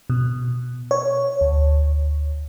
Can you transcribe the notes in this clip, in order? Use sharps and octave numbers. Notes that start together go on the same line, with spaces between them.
B2
C#5
D2